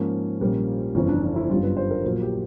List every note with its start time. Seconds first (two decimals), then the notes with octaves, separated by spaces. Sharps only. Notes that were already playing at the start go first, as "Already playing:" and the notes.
Already playing: G#2 F3 A#3 C#4
0.40 A#1 A#2 G3 A#3 C#4
0.95 G1 F2 C#3 E3 C#4
1.08 D4
1.22 D4
1.36 E4
1.50 G1 F#2 D3 G3 F4
1.63 B4
1.77 C5
1.91 A#4
2.04 A#1 A#2 F#3 A#3
2.22 G4